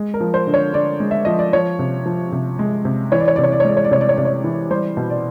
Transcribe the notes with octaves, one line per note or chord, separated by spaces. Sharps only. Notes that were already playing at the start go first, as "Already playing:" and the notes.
Already playing: G#3
A#4
F3
C5
D3
C#5
D3 D5
G#3
E5
F3 D#5
D5
F3 C#5
C3
F3
C3
G#3
C3
E3 C#5
D5
C#5
C3 D5
C#5
D5
C#5
G#3 D5
C#5
D5
C3 C#5
D5
C#5
C3 D5
C#5
E3
G3 C5
B2
D5